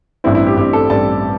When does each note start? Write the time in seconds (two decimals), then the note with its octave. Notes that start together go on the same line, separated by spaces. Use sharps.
0.24 A1 G2 G3 C4 E4
0.35 E4
0.47 G4
0.57 A1 G2 G3 C4 G4
0.73 A4
0.90 A1 G2 G3 C4 A5